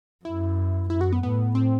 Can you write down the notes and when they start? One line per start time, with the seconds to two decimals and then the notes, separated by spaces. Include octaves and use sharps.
0.25 F#2 E4
0.90 F#2 E4
1.01 F#4
1.13 B3
1.23 A2 B3
1.55 C4